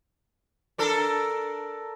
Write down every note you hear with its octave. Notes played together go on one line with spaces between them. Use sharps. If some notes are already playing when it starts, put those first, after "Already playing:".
D4 A4 A#4